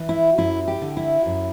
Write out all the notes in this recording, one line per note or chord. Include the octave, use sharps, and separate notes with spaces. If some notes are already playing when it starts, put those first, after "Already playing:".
Already playing: E3
E4
F#2 E4
G4
D3
E4
F#2